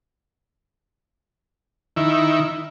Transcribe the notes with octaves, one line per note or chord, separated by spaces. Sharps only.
D#3 E4